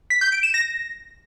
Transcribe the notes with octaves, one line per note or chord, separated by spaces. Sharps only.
B6
G6
D7
E7
A#6